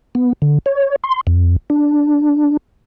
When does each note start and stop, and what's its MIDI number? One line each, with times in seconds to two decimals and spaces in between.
0.15 0.33 59
0.42 0.58 50
0.66 0.96 73
1.04 1.21 84
1.27 1.56 41
1.70 2.57 62